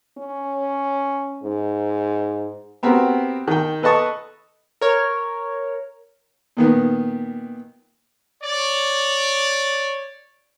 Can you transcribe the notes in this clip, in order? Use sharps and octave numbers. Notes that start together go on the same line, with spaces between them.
C#4
G#2
B3 C4 F#4 G4 A#4
D#3 G5
A4 B4 D#5 A5 C#6 D#6
A#4 C#5
A#2 D#3 B3
C#5 D5